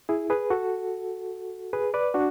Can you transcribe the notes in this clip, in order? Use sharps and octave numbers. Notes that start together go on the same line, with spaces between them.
E4 G#4
G#4 B4
F#4 A4
G#4 B4
B4 D5
D4 F#4